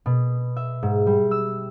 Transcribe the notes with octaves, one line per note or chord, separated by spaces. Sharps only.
B2
E5
G#2
G3
E6